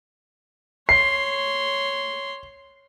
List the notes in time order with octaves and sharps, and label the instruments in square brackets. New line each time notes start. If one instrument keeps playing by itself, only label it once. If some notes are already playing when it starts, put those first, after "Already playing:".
[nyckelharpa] C#5 C6 [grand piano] C7